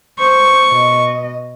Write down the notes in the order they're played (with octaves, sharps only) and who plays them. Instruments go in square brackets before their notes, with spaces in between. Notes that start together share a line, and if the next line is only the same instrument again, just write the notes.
[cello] C5 [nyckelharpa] C#6
[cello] B2 D#5